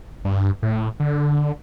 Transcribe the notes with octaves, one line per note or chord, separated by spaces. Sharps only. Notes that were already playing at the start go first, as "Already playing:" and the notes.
G2
A2
D3